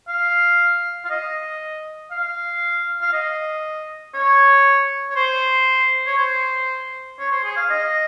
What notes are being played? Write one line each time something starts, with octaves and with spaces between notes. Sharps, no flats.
F5
F5
D#5
F5
F5
D#5
C#5
C#5
C5
C#5
C5
C#5
C5
G#4
F5
D#5